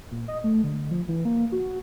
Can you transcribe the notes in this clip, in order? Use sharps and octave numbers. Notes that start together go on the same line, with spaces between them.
A#2
D#5
A3
D3
F3
E3
A#3
F#4